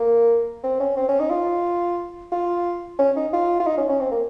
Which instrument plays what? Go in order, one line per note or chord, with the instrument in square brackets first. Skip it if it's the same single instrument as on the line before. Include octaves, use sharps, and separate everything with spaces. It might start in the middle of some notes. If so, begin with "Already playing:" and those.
Already playing: [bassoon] A#3
C4
C#4
C4
C#4
D#4
F4
F4
C#4
D#4
F4
F4
D#4
C#4
C#4
C4
A#3